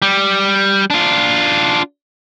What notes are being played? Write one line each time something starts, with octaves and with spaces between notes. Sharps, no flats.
G3
D4 F4